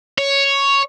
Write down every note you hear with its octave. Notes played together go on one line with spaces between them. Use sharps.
C#5